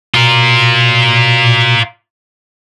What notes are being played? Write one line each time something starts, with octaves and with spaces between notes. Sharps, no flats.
B2 F4 A#4